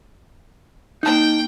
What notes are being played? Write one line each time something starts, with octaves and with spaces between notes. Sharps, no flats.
A#3 D#4 G5 A5